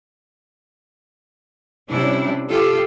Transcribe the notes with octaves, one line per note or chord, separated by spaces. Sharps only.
C3 G3 C#4 D4 E4
F4 G4 A4